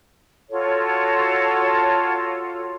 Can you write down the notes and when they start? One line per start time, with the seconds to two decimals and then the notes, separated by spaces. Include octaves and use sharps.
0.50 F4 F#4 A4 C#5